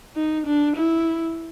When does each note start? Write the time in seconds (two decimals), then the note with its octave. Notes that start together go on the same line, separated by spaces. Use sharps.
0.16 D#4
0.47 D4
0.77 E4